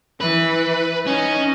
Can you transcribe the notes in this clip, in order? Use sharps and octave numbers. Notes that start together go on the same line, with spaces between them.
E3 B4
C#4 D#4